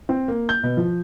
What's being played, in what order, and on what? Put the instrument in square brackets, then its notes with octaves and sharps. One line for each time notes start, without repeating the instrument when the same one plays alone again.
[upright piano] C4
A#3
G6
B2
F3